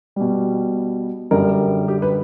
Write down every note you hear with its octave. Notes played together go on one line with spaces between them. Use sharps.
B2 G3
F#2 D3 G3 A#4
G4
B4